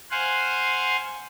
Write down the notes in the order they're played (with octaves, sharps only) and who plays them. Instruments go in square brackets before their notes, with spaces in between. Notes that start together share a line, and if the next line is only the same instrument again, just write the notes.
[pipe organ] C5 F5 F#5 G#5